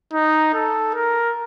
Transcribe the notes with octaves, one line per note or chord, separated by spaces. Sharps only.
D#4
A4
A#4